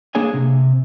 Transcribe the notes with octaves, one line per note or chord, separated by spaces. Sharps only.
A#3 D4 G#4 C#5 G#5
C3